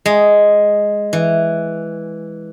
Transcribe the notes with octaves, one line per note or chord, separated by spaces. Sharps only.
G#3
E3